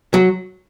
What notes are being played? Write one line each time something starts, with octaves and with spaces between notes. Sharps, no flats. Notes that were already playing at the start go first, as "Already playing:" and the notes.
F#3